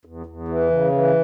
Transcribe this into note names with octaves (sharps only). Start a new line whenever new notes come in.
E2
E2
E3
C#3
E3